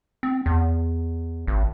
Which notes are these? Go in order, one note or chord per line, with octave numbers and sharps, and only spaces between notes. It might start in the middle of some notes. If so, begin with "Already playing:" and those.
C4
E2
G#1